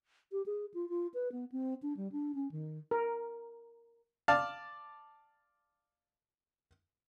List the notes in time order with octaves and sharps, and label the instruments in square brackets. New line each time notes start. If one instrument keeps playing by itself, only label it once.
[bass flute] G4
G#4
F4
F4
B4
B3
C4
D4
G3
D4
C#4
D#3
[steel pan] A#4
[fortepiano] D5 F5 A5